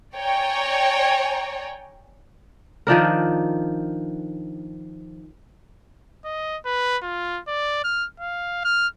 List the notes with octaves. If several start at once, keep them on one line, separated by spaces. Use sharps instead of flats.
C#5 D5 G5 G#5 A#5
D#3 F3 D4 A#4
D#5
B4
F4
D5
F6
F5
F6